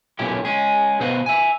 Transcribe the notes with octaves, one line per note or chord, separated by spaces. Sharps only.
B1 A#2 C#4 E4 G4
G#3 C#4 G#4
B2 B3 C5 D#5 F5 F#5
E5 G#5